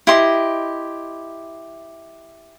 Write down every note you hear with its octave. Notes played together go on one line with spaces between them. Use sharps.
E4 G4 D#5 C6